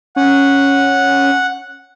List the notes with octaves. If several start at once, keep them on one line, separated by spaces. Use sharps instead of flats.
C#4 F#5